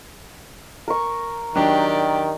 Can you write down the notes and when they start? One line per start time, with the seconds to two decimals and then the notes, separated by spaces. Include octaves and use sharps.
0.88 A#4 C#6
1.56 D#3 F#3 D4 G4 D5